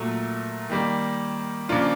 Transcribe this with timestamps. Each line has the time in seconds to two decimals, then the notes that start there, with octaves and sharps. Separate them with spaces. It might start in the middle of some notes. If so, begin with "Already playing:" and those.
Already playing: A#2 F#3 A3
0.70 D#3 G3 A#3
1.69 C#3 F3 A#3 D4 F4